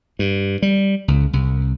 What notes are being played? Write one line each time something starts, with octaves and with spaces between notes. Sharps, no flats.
G2
G3
C#2
C2